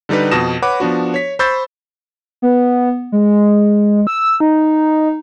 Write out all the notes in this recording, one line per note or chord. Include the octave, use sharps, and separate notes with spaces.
D3 G3 D#4 G4 B4
F2 B2 A5 D#6 A#6 E7
B4 C#5 F#5 B5 D6
F3 B3 D4 F#4
C#5 B6
C5 B5 C#6 E6 G6 A6
B3
G#3
E6
D#4